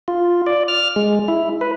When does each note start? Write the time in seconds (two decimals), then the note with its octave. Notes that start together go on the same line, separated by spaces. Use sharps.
0.08 F4
0.47 D5
0.68 F6
0.96 G#3
1.28 E4
1.61 B4